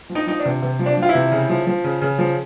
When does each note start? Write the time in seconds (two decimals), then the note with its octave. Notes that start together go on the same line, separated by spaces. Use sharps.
0.10 F3
0.15 D#4
0.27 F3 D#4
0.39 D4
0.45 C3
0.62 C3
0.79 F3
0.86 D4
0.97 F3
1.02 F4
1.09 E4
1.15 C3
1.32 C#3
1.49 F3
1.67 F3
1.84 C#3
2.02 C#3
2.18 F3